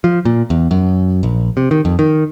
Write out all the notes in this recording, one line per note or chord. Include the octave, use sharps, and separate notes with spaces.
F3
A#2
E2
F#2
A#1
C3
D#3
F2
D#3